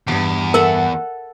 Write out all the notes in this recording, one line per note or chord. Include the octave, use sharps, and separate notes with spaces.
B1 E2 G2
A4 A#4 E5 F#5